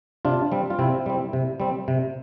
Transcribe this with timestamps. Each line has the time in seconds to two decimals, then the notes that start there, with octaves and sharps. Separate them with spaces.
0.25 C3 D4 F4
0.52 G3 C4
0.70 F4
0.79 C3 C4 E4
1.06 G3 C4
1.33 C3
1.60 G3 C4
1.88 C3